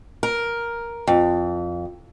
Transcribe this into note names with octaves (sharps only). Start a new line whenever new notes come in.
A#4
F2